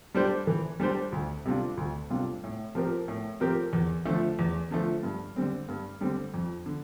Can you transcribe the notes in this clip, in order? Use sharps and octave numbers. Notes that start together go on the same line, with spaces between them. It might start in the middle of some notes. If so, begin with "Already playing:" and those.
G3 D4 G4 C5
E3
G3 D4 G4 C5
D2
C3 G3 D4 F4
D2
C3 G3 D4 F4
A2
F3 C4 G4 A#4
A2
F3 C4 G4 A#4
E2
D3 F3 A3
E2
D3 F3 A3
G2
D3 G3 C4
G2
D3 G3 C4
F2
D3